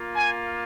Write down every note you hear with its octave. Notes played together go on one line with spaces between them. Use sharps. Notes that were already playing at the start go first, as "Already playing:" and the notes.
Already playing: A#3 F4
G#5